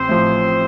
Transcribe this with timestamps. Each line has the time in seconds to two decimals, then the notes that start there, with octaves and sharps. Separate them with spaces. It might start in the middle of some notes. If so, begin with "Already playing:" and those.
Already playing: A1 C4 C5
0.09 A2 F3